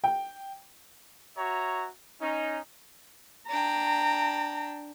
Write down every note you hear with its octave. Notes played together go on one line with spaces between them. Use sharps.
G5
F#4 C#5 E5 A#5
C#4 D#4
D4 G5 A#5